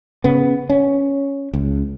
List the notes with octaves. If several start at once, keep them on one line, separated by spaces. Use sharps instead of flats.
C#3 B3
C#4
C#2